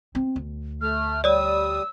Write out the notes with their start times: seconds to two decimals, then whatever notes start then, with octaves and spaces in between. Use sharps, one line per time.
0.15 C4
0.36 D2
0.81 A3 F6
1.24 G3 C#5 D5 D#6 E6